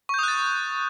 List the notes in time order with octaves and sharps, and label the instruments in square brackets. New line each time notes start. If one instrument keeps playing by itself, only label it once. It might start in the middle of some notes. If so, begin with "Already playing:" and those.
[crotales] C#6
G6
D#6
F#6
A6